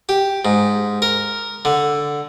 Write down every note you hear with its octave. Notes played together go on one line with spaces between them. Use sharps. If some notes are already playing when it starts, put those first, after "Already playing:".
G4
G#2
A#4
D3